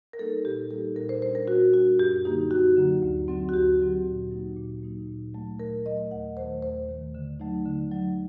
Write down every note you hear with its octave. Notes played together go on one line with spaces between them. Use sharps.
A#4
G3 A#3 D#4 A4
A#2 G4
G3 A#3 D#4 A4
A#2 A#4
C5
G3 D4 C5
A#4
A#2 F#4
G3 D4 F#4
F#2 G4
D3 F#3 A#3 D#4 G4
F#2 F#4
D3 F#3 A#3 D#4
D2
D3 F#3 C4
F#4
D2 G4
D3 F#3 C4
A#2
F#3 A#3 D#4
A#2
F#3 A#3 D#4
A#2
F#3 A3
A#2 A#4
F#3 A3 D#5
D#2 F#5
D#3 A3 C5
D#2 C5
D#3 A3
D3
F#3 A3 D#4
D3
F#3 A3 D#4